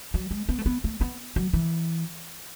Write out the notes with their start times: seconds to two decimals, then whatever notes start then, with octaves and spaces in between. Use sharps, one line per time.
0.14 F#3
0.31 G#3
0.49 B3
0.59 A3
0.66 B3
0.84 A3
1.01 B3
1.36 F#3
1.53 E3